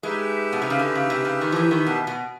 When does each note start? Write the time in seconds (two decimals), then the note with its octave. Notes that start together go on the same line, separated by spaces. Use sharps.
0.03 G#3 D#4 G4 B4 E5
0.52 B2
0.62 C3
0.70 C#3
0.79 D3
0.95 C#3
1.10 C3
1.25 C#3
1.41 D#3
1.52 F3
1.56 E3
1.71 D#3
1.87 B2
2.07 B2